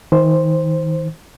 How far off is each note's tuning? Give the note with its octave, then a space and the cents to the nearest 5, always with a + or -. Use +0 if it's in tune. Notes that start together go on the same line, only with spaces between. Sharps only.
D#3 +35 C5 +0